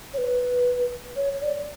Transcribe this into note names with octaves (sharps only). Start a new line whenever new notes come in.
C#5
B4
C#5
C#5
D5